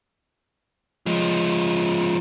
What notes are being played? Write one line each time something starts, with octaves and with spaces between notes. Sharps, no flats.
F3 G#3